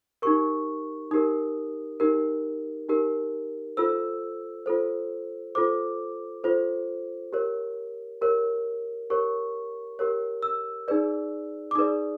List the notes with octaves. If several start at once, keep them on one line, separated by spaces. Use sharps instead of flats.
D#4 G4 A#4 C#6
D#4 G4 A#4 D#6
D#4 G4 A#4
D#4 G4 A#4
F4 A4 C5 E6
F4 A4 C5
F4 A4 C5 D6
F4 A4 C5
G4 A#4 C#5
G4 A#4 C#5
G4 A#4 C#5 C#6
G4 A#4 C#5
E6
D#4 G#4 B4 D5
D6
D#4 G#4 B4 D5 D#6